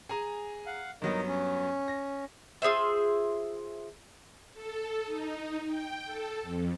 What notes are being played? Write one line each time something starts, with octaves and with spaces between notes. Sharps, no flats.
G#4 G#5 A#5
F5 F#5
G2 F#3 B3 D#4 A#4
C#4
A#6
F4 G#4 C5 E5
A4
D#4
G5
A4
F2